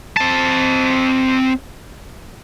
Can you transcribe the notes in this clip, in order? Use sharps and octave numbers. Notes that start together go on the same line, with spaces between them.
C4 A5